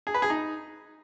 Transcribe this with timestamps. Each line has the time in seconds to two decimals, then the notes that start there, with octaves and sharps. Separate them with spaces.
0.07 G#4
0.14 B4
0.22 G#4
0.30 D#4